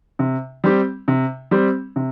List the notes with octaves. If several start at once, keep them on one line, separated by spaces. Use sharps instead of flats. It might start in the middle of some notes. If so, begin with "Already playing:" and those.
C3
G3 C4 G4
C3
G3 C4 G4
C3